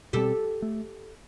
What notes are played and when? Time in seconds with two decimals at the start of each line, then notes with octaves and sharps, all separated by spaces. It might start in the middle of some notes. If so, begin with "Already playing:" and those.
0.13 B2 G3 C4 G4 A4
0.62 A3